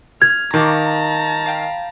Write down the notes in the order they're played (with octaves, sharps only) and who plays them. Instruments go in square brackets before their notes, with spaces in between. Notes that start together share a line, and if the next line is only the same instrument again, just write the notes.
[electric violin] F6 [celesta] G#6
[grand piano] D#3 [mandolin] F5 C#6 D6 [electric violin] A5 A#5
[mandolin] F5 G5 B5